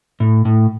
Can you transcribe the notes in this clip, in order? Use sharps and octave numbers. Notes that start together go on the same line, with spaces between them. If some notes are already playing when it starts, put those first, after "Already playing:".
A2
A2